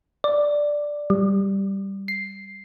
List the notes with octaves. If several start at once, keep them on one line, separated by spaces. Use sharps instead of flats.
D5
G3
C7